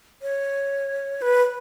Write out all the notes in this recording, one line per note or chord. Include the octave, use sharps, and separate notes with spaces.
C#5
B4